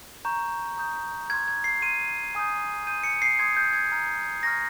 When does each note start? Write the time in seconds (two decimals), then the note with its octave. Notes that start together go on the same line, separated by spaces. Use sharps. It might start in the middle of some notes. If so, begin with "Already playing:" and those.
0.25 A#5 C#6 G6
0.77 A#5 D#6 G6
1.30 C6 F6 G#6
1.48 G#6
1.64 C7
1.82 C6 F6 D#7
2.35 G#5 D#6 G6
2.87 C6 D#6 G6 D#7
3.04 C#7
3.22 C7
3.39 C6 D#6 G6 G#6
3.57 G6
3.73 G#6
3.92 A#5 F6
4.43 A#5 C#6 F6 A#6